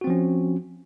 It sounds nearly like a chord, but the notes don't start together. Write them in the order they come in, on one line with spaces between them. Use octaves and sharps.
F#4 C4 F3 C#4